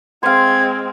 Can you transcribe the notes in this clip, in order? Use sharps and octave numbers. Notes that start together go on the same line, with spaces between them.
G#3 C4 F5 C6 G#6